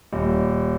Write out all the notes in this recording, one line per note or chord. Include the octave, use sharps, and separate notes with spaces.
D#1